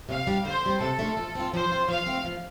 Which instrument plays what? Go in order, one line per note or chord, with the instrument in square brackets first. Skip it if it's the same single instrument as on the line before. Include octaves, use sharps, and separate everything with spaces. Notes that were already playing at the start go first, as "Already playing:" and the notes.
[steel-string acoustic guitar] C3 [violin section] F5
[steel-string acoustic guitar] G3 D4
[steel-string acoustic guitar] D3 [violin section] C5
[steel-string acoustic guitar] G3 C4
[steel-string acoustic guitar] C3 [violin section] A4
[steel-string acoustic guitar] A3 D4 F4
F3
C4 F4
[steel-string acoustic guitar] F3 [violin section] C5
[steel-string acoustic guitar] C4 F4
[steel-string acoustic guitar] F3 [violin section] F5
[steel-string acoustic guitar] A3 C4 F4
F3